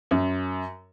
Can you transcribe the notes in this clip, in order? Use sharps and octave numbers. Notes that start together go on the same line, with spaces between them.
F#2